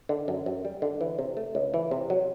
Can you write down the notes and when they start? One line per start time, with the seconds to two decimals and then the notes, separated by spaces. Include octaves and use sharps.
0.09 D3
0.28 F#2
0.46 F#2
0.65 G3
0.82 D3
1.01 E3
1.19 C3
1.37 A3
1.55 C#2
1.74 E3
1.91 C3
2.10 F#3